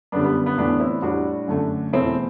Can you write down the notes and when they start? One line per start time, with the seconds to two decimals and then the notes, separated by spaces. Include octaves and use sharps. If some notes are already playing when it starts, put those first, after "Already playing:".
0.12 F#2 D3 G3 B3 D4
0.24 B3
0.46 B3
0.58 A2 E3 A3 B3 D4
0.80 C4 E4
1.02 A2 G3 D4 F#4
1.48 F#2 D3 A3
1.93 E2 B2 A3 C4 E4